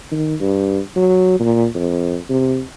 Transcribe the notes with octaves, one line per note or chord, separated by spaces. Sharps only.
D#3
G2
F#3
A#2
F2
C3